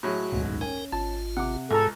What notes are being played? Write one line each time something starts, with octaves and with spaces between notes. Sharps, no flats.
A2 F#3 G#3 F#4
D#1 B1 G#2
C#4 A#4 G5 G#5
G#1 F4 A5
C3 F#5 D6
C#2 G#2 G#4 A4 A#5